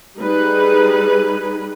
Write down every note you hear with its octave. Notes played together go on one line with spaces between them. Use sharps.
G3 D#4 G#4 B4